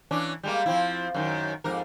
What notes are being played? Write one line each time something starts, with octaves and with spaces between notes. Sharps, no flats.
E3 C#4 D4
G3 G#3 A#3
F3 C4 E4
F#2 D#3
F2 G#2 A#4